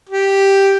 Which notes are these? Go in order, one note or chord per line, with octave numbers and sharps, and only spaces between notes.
G4